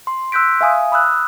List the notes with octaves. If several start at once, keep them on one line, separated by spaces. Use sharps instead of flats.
C6
C6 E6 F#6 G6 B6 D7
E5 F5 G#5 D#6
B5 D#6 E6 F#6